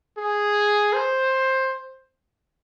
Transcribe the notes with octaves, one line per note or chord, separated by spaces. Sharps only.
G#4
C5